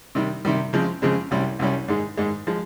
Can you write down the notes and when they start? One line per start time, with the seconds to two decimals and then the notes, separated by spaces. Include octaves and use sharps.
0.15 C3 D#3 G3
0.45 C3 D#3 G3
0.73 C#3 F3 G#3 C4
1.02 C#3 F3 G#3 C4
1.31 C2 C3 G3 C#4
1.59 C2 C3 G3 C#4
1.88 G#2 D#3 G#3
2.17 G#2 D#3 G#3
2.47 F3 G#3